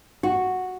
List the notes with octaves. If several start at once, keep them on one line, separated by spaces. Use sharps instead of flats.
F#4